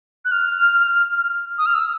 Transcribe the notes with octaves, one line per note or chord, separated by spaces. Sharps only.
F#6
F6
D#6
F6
E6